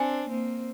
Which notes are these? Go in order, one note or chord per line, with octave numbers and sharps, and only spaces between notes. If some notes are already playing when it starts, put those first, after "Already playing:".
Already playing: C4 D4 G#5
A#3 C4